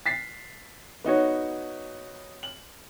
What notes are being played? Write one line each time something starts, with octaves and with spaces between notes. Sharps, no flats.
A6 B6 C7
B3 D#4 F#4 C#5
F#7